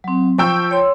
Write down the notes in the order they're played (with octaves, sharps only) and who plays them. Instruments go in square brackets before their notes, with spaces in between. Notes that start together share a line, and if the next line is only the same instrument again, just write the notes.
[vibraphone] F#3 C4
[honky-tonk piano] F3 G5 E6 [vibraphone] C#6
[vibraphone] C#5 C6